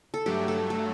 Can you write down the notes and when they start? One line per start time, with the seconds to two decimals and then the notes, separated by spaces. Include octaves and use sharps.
0.14 A4
0.26 G2 F#3 A3 G4
0.48 A4
0.70 A4